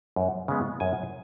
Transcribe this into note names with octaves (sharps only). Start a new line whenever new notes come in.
F#2
C#3 G#3 B3
F#2 G#5